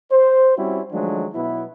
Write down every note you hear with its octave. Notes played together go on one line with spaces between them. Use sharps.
C5
G3 C4 C#4 E4 F#4
D#3 F3 F#3 G#3 A3 D4
B2 F#3 B3 E4